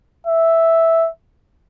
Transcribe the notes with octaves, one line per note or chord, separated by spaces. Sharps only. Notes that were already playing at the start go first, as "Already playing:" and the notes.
E5